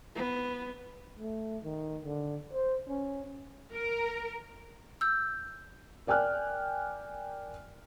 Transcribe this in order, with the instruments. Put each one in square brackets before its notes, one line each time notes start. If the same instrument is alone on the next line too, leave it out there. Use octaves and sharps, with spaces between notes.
[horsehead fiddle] B3
[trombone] A3
D#3
D3
C5
C#4
[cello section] A#4
[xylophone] E6 G6
[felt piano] A#4 D5 G5 G#5 F6 F#6